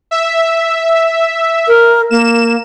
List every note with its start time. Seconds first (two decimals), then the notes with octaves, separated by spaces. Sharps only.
0.11 E5
1.68 A#4
2.11 A#3 E7